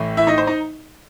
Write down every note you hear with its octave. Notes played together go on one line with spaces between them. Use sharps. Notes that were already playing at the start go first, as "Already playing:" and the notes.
Already playing: A1 A2 E3 A3
E4 E5
D#4 D#5
C5
D#4 D#5